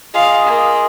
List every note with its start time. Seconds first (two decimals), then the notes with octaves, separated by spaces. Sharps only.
0.14 F4 G#4 D#5 F5
0.46 A#3